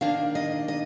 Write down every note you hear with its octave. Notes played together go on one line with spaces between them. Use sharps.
D#3 A#3 D4 F5
D#5
D#5